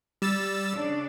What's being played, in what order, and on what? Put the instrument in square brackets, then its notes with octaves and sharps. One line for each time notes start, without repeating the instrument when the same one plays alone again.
[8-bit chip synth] G3 E6 A6
[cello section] C#3 D4